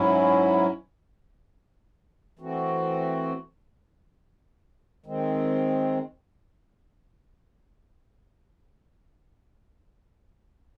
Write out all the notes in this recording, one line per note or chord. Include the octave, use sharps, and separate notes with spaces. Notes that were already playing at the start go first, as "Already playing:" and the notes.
Already playing: G#2 F#3 C#4 E4
E3 A3 C4 F#4
D#3 G#3 C4